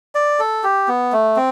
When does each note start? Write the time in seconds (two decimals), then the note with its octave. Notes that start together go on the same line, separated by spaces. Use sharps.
0.15 D5
0.39 A4
0.64 G4
0.88 B3
1.12 A3
1.36 C4